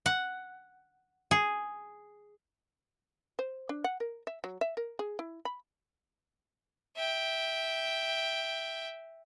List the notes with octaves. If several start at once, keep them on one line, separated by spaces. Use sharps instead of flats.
F#5
G#4
C5
D4
F#5
A#4
E5
F#3
E5
A#4
G#4
E4
B5
E5 G5